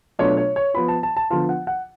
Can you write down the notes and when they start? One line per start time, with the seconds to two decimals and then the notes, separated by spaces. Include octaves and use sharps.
0.19 B2 F#3 A3 D4 F4 C#5
0.37 C#5
0.56 C#5
0.74 F3 B3 F4 B5
0.88 A5
1.03 A5
1.17 A5
1.30 D3 F3 B3 F4 A5
1.49 F#5
1.67 F#5